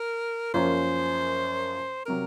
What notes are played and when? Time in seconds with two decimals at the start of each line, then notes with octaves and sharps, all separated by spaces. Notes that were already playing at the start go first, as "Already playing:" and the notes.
Already playing: A#4
0.54 F#2 F3 A#3 C#4 C5
2.05 C3 F#3 A#4